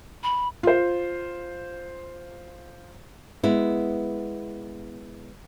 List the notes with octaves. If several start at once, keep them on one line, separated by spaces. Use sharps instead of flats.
B5
F4 C5
G#3 B3 E4